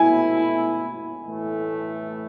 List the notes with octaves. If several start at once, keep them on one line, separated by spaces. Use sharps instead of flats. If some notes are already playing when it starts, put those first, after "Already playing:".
Already playing: B2 A3 E4 G#5
A2 E3 A3